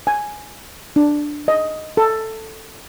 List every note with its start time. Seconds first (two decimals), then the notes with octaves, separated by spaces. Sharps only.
0.07 G#5
0.96 D4
1.48 D#5
1.97 A4